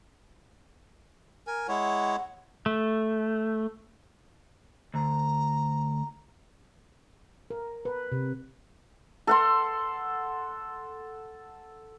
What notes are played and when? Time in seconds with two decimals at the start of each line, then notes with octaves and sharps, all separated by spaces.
1.47 A#4 G#5
1.68 G#3 E4 C#5 F#5
2.66 A3
4.94 D2 A#5
7.50 A#4
7.85 B4
8.12 C3
9.27 A4 F#5 C6